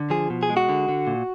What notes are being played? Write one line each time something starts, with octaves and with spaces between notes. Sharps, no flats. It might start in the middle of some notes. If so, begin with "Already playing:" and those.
Already playing: D3
F3 G#4
B2
G#4
G#3
F#4
D3
D3
A#2